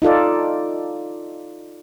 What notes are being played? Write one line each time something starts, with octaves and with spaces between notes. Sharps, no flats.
D#4 F4 A4 D5